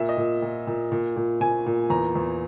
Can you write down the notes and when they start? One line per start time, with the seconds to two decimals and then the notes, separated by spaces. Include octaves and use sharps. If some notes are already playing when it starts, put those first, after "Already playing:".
Already playing: A#2 E5
0.09 D#5
0.17 A#2
0.42 A#2
0.67 A#2
0.92 A#2
1.16 A#2
1.41 A#2 G#5
1.66 A#2
1.90 E2 A#5
2.16 E2